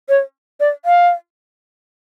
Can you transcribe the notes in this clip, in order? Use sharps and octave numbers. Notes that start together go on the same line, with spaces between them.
C#5
D5
F5